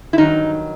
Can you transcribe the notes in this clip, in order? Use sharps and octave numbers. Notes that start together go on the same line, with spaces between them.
E4
G2 D#3 F#3 D#4